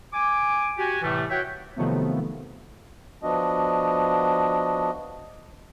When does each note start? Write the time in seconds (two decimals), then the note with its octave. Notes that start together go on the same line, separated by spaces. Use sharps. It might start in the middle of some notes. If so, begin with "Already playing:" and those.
0.13 G#5 D6
0.78 F#4 G4 G#5
1.02 A2 C3 E3 G3 A3
1.30 F#4 C#5 E5 F#5 G5
1.76 C3 D#3 F3 F#3 A3 B3
3.23 F3 B3 D4 F#4 D#5